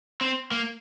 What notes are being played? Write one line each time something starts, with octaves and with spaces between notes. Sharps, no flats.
C4
A#3